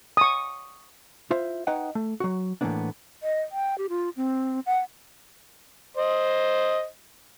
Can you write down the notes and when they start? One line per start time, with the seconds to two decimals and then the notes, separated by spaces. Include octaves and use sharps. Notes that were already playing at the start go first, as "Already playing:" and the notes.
0.17 C#6 D#6
1.31 E4 F4 C5 E5
1.67 D#4 B4 C#5 D#5 F#5 G5
1.95 A3
2.20 F#3 F#4
2.61 A2 E3 G#3 A#3 B3 D4
3.21 D#5
3.52 G5
3.78 G4
3.89 F4
4.17 C4
4.66 F#5
5.97 C5 D#5